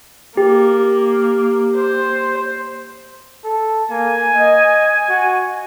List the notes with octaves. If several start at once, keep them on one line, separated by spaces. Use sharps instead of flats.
A#3 G4
C5
A4
A#3 G#5
D#5
F#4